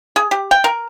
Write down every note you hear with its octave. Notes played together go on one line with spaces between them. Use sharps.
G#4
G4
G5
A#4